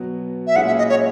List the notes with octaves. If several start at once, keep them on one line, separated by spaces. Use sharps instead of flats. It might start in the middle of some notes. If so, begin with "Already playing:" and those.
Already playing: B2 F#3 B3 F#4
E5
A#2 G#3 C#4 E4 G#4 F#5
E5
D#5
C#5